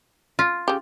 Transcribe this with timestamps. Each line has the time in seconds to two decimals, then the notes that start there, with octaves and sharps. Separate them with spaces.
0.39 F4
0.68 C#3 G4